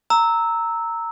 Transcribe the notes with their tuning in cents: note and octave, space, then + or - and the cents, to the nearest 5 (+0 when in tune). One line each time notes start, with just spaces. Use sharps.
A#5 -15 E6 -15